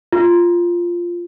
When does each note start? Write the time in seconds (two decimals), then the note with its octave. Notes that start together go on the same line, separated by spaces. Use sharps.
0.13 F4